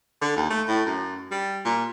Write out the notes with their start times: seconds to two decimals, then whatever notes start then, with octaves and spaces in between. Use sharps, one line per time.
0.21 D3
0.37 D#2
0.50 A3
0.68 A2
0.86 F#2
1.31 G3
1.65 A#2